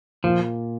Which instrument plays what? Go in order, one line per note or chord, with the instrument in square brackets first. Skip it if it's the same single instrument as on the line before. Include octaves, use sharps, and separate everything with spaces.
[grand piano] A#2 A#3 F4 [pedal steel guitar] F3